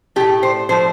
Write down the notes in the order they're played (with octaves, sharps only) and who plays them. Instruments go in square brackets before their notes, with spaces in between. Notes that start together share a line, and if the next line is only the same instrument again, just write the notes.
[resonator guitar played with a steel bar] A2 F3 A3 G4
C5
A2 F3 A3 C5